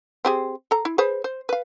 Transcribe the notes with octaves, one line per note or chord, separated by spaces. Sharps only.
C4 G4 G#4
A4 A#5
E4
G#4 B4 C5
C5
B4 F5